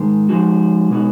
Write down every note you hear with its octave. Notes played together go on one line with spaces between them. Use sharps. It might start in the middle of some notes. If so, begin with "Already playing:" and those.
Already playing: G#2 D#3 G#3
F3 G#3 D#4 F#4
B2 G#3 D#4 F#4